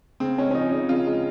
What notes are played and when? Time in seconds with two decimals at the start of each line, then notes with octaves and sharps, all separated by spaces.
0.20 C#3 C4
0.38 G#3 C#4
0.51 C#4
0.54 F3 D#4
0.72 C#3 D#4
0.89 C#3 F4
1.07 G#3